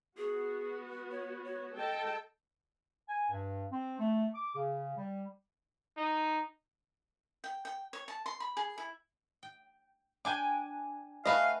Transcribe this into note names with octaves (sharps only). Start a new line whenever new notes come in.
B3 F#4 G#4
C#5
C#5
A4 D#5 G5 A5
G#5
G2
C4
A3
D6
C#3
G3
D#4
G5
G5
C#5
A5
C6
B5
G#4
E4
G5
D4 G5 G#5 D6
A3 F#4 G#4 B4 D#5 F5